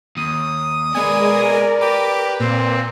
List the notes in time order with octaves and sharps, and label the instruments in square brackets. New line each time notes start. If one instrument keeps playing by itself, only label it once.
[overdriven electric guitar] D#2 [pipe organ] D#6
[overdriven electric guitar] B2 B4 [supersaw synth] G#3 G#5 [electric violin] A#4 D5
[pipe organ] G4 [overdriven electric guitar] B4 [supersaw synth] D6
[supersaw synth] A#2 [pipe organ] C4